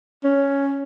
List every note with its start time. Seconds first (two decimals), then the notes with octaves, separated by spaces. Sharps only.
0.24 C#4